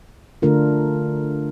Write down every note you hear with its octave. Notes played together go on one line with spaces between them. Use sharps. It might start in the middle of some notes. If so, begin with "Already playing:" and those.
D3 A3 D4 F4 A#4